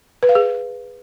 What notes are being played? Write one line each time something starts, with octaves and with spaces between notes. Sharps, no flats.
B4
F5
G#4